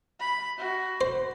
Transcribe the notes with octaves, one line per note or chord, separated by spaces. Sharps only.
B5
F#4
C5